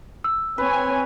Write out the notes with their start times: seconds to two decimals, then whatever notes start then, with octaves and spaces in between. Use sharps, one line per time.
0.24 E6
0.58 C4 B4 C#5 G#5